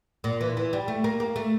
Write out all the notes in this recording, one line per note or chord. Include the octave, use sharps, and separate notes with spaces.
A#2
E3
E3
G3
A3
A#3
A#3
A3